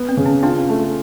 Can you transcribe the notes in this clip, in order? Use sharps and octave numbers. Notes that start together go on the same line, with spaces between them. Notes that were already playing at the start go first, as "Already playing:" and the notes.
Already playing: B3
C4
C#3
C#4
C4 D4 F4
A3